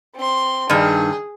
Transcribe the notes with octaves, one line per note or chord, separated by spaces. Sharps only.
C4 C6
G2 D#3 G#4